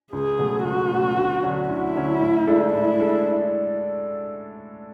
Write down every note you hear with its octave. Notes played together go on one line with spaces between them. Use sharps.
C#2 G#4
B2 F#3 A3
C#2 F#4
B2 F#3 A3
D2
D3 F#3 C#4
D2 E4
D3 F#3 C#4
A2
G#3 D4 A4
A2 E4
G#3 D4 A4